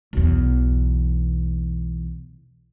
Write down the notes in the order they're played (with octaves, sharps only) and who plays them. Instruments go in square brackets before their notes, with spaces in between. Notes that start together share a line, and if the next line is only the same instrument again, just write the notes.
[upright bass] B1 E2